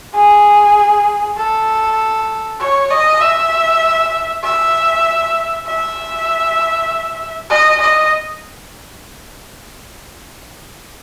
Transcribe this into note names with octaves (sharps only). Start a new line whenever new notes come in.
G#4
A4
C#5
D#5
E5
E5
E5
D#5
D#5